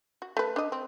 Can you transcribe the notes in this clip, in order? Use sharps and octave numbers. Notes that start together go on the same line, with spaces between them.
F#4
A3 B4
D4 D#5
C4